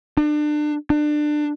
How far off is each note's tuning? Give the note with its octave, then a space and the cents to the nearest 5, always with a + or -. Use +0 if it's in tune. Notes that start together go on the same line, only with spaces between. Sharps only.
D4 +30
D4 +25